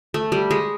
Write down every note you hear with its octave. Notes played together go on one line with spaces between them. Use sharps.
A3
G3
G#3